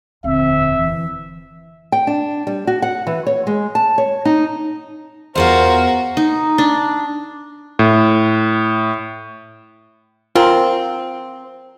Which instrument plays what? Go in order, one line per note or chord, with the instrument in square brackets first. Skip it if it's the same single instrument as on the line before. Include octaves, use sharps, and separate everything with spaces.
[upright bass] D#1 F2 [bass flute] D3 [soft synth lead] C4 [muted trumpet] E5
[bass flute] E3
[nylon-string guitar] G5
D4
G3
F#4
F#5
E3
C#5
G#3
A5
C#5
D#4
[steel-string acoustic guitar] E2 F4 F5 [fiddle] F#4 [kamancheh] A#4 [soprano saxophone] C5
[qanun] D#4
D4
[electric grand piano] A2
[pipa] C4 [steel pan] F4 A#4